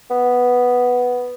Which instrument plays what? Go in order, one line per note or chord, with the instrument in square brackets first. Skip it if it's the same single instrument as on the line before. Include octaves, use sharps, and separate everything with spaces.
[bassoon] B3